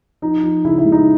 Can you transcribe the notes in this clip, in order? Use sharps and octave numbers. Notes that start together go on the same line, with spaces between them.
F3 D#4
F3
C#3 E4
E4
G#3
D#4